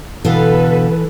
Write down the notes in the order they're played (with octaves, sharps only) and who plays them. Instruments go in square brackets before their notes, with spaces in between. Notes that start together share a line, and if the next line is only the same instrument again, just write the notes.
[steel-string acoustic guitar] B2 D3 F5 [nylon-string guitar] E3 [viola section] A4 B4